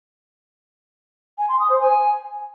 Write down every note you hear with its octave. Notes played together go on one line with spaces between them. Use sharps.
G#5
C6
D#6
C5
G#5